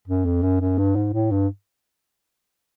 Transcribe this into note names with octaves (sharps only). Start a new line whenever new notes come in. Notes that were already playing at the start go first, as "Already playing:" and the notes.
F#2
F2
F#2
F#2
G2
G#2
A2
G2